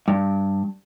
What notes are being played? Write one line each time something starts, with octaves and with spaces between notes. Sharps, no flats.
G2